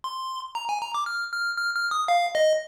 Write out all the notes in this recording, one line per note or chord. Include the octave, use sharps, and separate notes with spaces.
C6
A#5
G#5
A#5
D6
F6
F6
F6
F6
D#6
F5
D#5